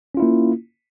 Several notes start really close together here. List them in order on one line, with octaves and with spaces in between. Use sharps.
C#4 F4 E4 A#3